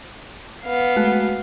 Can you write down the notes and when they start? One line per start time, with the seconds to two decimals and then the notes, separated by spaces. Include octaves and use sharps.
0.64 B3 F5
0.96 G#3 A3 F#4